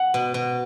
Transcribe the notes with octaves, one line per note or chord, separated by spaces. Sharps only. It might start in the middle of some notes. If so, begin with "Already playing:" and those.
Already playing: F#5
B2
B2